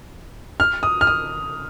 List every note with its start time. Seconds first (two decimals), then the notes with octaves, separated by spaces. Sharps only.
0.60 F6
0.83 D#6
1.01 F6
1.07 D#6